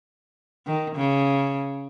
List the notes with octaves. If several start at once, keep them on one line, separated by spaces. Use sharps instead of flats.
D#3
C#3